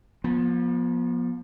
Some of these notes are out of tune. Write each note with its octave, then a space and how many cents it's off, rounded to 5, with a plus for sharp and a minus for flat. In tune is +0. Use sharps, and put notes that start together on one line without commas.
F3 +20 B3 -40